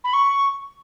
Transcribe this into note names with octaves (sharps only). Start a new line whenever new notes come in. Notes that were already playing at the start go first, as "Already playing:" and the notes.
B5
C#6